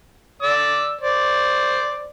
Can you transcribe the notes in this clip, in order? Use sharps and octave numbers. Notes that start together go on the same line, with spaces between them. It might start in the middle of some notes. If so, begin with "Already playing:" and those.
D5 E6
C5 D5